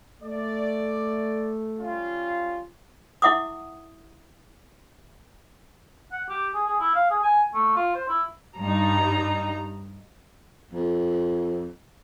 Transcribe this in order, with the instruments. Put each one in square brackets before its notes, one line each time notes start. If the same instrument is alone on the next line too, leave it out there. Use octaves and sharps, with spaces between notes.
[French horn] A3 [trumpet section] D5
[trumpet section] G3 C#4 F4
[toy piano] E4 E5 F#5 D6 D#6
[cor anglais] F#5
G4
G#4
G#4
E4
F5
G#4
G#5
A3
F4
C5
E4
[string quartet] G2 A#5 [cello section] G3 D#4
[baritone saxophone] F2